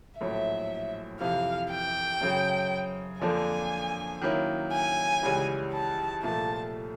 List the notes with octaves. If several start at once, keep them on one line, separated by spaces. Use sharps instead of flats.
A#1 A2 F#3 E5
F2 C3 E3 F5
G5
F#2 C#3 F#3
F2 D3 F3 A#3 D4 G#5
D#3 F#3 A#3 C#4 E4
G#5
C#2 C#3 E3 G3
A5
C2 A#2 F3 A3 A5